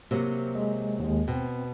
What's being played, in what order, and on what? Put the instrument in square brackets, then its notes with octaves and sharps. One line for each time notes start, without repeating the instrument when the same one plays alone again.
[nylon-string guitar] C3 F#3 A#3
[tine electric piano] G#3
D#2 G#3
[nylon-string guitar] B2 [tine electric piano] C4